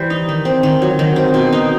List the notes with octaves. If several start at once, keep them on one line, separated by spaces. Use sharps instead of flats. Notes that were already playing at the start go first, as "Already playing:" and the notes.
Already playing: E3 G3 C5
D#4
D#3
C4
D#3
F#3
D#3
C4
B2
D#4